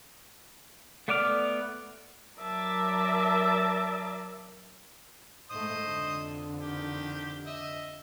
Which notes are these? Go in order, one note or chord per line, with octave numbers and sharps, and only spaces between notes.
A3 B3 D5 D6 F6
F#3 A#4 D5 E5 A5 D6
G#2 A3 C5 D#5 D#6
F2 D3
D#3 G4
D#5 E5